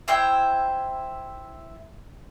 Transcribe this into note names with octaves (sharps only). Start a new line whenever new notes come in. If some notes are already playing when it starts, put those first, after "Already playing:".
E4 C5 E5 G5